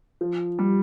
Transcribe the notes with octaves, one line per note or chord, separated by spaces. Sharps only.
F3
G3